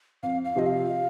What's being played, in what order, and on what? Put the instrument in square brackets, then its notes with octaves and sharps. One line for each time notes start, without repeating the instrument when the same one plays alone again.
[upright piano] F2 [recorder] F5
[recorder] F5
[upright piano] C3 F3 C4 [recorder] D#5
[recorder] F5